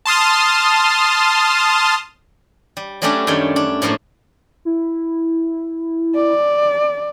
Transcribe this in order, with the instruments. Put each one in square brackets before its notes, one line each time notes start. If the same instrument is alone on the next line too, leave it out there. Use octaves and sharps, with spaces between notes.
[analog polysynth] A5 C6 D#6 F6
[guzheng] G3
F#3 G3 A3 C#4 D4 G4
F#2 D#3 G3 A3 C#5 G5
D4
A2 F3 F#3 A3 A#3
[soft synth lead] E4
[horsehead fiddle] D5